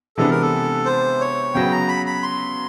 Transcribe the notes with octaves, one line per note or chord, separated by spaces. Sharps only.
C3 E3 G#3 B3 D4 A4
A#4
A4
C5
C#5
C#3 F#3 B3 G5
A#5
B5
B5
C6